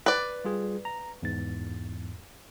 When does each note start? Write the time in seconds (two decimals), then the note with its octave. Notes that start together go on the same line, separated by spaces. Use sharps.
0.06 B4 D5
0.45 G3 F4 G#4
0.85 A#5
1.22 E2 G#2 A6